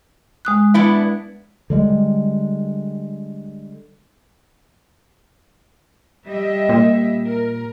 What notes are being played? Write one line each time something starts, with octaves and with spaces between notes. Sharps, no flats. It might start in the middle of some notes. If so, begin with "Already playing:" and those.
G#3 D#6 F#6
B3 D4 E4
D3 G3 G#3
G3 D#5 E5
A#2
A#4